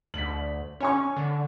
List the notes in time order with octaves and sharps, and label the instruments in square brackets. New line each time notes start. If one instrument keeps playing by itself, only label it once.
[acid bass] D2 [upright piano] B6 F#7
[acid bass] C#4 [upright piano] C#5 G#5 C#6
[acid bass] D3